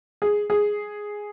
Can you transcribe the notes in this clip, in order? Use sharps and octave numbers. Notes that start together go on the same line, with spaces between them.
G#4
G#4